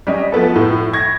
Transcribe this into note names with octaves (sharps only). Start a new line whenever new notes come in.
G3 C#4 D#5
F3 A3 B3 A4
A2
C#6 G#6 A#6